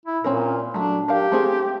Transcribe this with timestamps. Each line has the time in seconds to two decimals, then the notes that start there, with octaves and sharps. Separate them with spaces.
0.06 E4
0.24 A#2 C4 C#4 A#4
0.74 F#3 A3 D4
1.08 D4 G4 A#4 F5
1.32 A3 C4 G#4